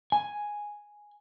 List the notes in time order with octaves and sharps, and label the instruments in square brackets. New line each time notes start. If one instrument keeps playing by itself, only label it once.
[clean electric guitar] G#5